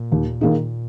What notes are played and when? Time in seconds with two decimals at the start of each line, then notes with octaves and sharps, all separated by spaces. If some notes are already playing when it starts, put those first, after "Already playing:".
Already playing: A#2
0.12 D#2
0.41 D#3 A#3 D#4 G#4